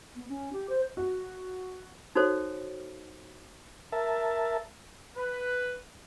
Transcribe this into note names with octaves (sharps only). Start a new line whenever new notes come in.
B3
C#4
G4
C5
F#4
D#4 F#4 A4 C5 C#5
A#4 E5 A5
B4